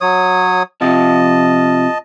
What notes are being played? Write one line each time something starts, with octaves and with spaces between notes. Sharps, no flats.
F#3 C#5 D#6
C3 F3 F4 D#5 A5